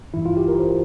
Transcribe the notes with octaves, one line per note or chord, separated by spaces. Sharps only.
G#1 G2 E3 E4
F4
G4
A#4
C5